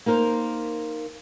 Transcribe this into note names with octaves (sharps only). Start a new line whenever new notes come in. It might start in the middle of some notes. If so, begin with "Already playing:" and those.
A#3 D#4 A#4 C5